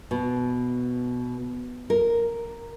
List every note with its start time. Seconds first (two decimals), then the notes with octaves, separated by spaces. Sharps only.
0.11 B2
1.90 A#4